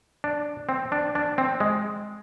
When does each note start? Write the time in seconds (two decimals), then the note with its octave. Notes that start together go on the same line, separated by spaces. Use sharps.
0.24 D4
0.69 C4
0.92 D4
1.15 D4
1.38 C4
1.60 G#3